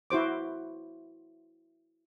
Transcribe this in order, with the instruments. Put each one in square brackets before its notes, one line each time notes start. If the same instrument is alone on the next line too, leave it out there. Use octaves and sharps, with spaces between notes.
[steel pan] E4 F#4 C5 D6